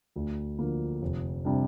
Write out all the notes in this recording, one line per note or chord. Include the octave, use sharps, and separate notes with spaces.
D2
D3 F3 A#3
F1
C3 G3 D4